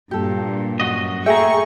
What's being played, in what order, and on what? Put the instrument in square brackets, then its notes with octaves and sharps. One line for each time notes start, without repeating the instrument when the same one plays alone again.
[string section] G2 A#2 [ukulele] G4 A4
[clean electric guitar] F#2 F#4 D#5
[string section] A3 C#6 [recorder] G#4 [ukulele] E5 [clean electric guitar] G5 A#5